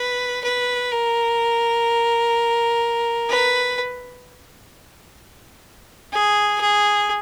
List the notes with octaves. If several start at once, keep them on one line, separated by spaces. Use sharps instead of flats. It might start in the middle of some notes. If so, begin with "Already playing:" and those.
Already playing: B4
B4
A#4
B4
G#4
G#4